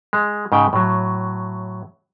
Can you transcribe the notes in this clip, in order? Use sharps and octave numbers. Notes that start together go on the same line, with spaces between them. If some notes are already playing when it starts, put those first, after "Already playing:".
G#3
G#2 C#3 G5
A2 F#3